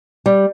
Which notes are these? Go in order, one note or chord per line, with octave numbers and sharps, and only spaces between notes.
G3